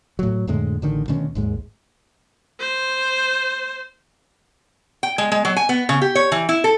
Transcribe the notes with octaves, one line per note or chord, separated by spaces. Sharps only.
A2 F#3
F2 A2 D3 G#3
A1 D3 D#3
D2 B2 D#3 C#4
G#1 D#2 G#2 G#3
C5
G5
G#3
G#3
F#3
G#5
B3
C#3
G4
C#5
E3
E4
A4